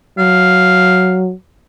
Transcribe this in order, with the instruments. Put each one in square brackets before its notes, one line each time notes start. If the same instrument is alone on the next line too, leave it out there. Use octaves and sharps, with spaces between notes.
[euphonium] F#3 [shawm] F5